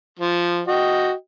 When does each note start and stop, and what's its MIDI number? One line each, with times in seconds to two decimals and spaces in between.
0.19 0.62 53
0.68 1.12 66
0.68 1.12 75
0.68 1.12 79